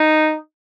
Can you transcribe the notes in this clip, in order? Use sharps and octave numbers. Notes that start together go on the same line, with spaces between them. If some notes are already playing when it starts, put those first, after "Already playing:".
Already playing: D#4